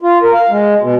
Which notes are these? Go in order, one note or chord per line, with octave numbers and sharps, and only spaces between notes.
F4
A#4
F5
G#3
B2